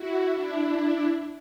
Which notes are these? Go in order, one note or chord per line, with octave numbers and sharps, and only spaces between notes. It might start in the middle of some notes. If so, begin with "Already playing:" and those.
Already playing: E4 F#4
D4 E4